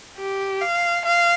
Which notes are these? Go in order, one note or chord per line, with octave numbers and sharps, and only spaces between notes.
G4
F5
F5